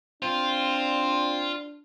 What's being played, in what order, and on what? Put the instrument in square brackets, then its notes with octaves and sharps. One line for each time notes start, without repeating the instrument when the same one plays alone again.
[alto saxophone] C4 [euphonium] D4 [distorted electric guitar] F4